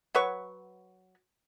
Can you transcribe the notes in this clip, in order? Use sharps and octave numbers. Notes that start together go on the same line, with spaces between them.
F#3 B4 C#5 C#6